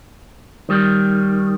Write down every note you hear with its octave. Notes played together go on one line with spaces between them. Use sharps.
D#3 G3